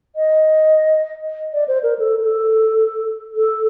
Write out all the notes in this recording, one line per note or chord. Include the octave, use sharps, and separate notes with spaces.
D#5
D5
C5
A#4
A4
A4
A4